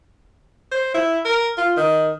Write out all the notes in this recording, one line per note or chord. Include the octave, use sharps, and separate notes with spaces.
C5
E4
A#4
F4
D#3